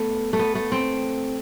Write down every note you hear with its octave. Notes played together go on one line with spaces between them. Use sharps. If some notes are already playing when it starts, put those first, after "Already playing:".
Already playing: A3 B3
A3
B3
A3
C4